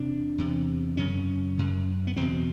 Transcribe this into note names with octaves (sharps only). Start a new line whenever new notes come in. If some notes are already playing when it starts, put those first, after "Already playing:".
Already playing: E2 C3 D4
E2 C3
F#2 C#3 C#4
F#2 C#3
B3
E2 B2 C4